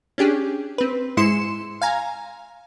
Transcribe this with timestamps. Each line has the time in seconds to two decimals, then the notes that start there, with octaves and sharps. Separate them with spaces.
0.18 C#4 D4 G4 G#4
0.78 C4 B4
1.17 G#2 G#3 E4 C6 C#7 E7
1.82 F5 G#5 A#5